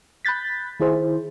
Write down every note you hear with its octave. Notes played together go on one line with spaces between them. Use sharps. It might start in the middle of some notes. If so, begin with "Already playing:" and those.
B5 F#6 G6 A6 B6
D#3 E4 G#4 C5